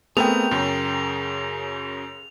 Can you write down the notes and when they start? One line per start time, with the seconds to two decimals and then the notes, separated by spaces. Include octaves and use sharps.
0.17 A3 B3 C4 G#4 A#4 G5 F7
0.51 F#2 C#3